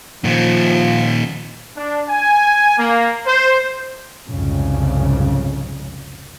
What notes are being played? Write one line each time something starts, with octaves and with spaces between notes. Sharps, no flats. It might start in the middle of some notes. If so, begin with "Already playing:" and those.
A#2 D#3 F3
D4
G#5
A#3
C5
C2 F2 G#2 C#3